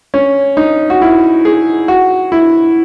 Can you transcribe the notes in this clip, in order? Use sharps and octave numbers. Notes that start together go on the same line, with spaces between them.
C#4
D#4
F#4
E4
G#4
F#4
E4